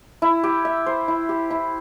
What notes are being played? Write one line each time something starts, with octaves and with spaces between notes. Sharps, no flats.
E4
G4
E5
C5
E4
G4
E4